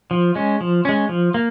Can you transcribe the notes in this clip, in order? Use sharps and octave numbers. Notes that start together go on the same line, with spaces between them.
F3
G#3 C#4
F3
G#3 C#4
F3
A#3